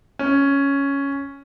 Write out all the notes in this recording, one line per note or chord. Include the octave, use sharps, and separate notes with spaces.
C#4